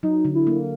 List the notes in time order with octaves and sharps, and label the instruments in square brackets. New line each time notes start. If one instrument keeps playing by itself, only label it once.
[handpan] F#3 [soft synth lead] D#4
[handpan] D3
[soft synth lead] E4
[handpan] A#3